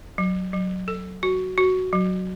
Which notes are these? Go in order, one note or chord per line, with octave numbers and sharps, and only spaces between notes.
F#3
F#3
A4
F#4
F#4
F#3